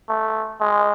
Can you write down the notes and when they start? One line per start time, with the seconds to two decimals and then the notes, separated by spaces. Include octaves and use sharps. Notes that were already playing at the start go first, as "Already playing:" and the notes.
0.09 A3
0.61 G#3